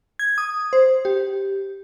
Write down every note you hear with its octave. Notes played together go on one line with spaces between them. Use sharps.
G#6
D#6
C5
G4